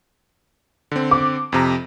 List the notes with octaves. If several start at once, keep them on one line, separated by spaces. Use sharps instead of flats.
D3 C4
D6
F2 C3 A#5